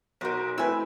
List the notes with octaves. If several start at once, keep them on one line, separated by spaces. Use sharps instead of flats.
B1 D#4 F#4 A#4 C5
A3 C4 E4 B4 G#5 E6